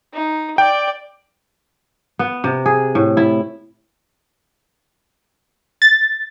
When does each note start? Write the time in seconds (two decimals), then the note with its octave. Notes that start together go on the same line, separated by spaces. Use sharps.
0.13 D#4
0.58 D5 G5
2.19 B3
2.44 C3
2.66 G#4
2.95 A2
3.17 E4
5.82 A6